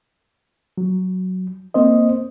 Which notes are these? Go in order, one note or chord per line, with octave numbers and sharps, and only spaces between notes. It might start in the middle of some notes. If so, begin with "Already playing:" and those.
F#3
A#3 C4 C5 D#5